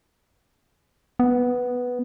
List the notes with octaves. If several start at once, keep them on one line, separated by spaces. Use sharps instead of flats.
B3